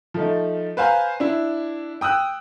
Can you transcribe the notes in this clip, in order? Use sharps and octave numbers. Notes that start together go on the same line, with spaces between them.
F3 A3 D#4
B4 C5 F5 G#5 A#5
D4 E4
G5 D#6 E6 F#6